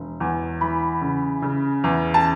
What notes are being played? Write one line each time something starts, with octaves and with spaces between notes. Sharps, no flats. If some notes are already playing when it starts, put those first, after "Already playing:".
Already playing: E1
E2
E3 B5
C#3
C#3
E2
A5